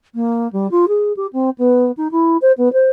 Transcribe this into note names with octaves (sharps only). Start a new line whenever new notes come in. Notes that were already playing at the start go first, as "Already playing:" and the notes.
A#3
G3
F4
G#4
G4
C4
B3
D#4
E4
C5
B3
C5